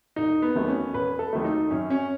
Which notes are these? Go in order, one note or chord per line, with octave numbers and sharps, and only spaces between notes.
E1 D#4
B3
D#2 D#3 F#3 A3
C#4
E1 B4
A4
D#2 D#3 F#3 A3
D#4
F#2 C#4
C#4